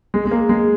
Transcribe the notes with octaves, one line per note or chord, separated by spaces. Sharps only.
G#3
G#3
A#3
G#3